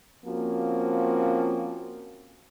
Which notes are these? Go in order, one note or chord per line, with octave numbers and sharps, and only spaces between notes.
F3 A#3 C4 C#4 F#4